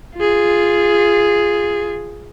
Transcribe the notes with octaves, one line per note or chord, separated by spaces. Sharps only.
F4 G#4